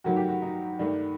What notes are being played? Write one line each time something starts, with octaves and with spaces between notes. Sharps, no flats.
G2 D#3 F#3 A3 F#4
G4
F#4
D#4
G2 D#3 A3 D4